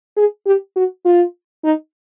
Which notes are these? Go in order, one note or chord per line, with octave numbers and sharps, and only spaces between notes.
G#4
G4
F#4
F4
D#4